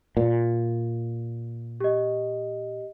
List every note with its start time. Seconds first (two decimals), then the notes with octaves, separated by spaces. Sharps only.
0.17 A#2
1.80 G4 D#5